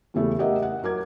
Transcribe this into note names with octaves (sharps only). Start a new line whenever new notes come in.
E2 C#3 G3 A3 E4
G4 A#4 D#5 E5 F#5
F#5
F#3 A#4 D6 G#6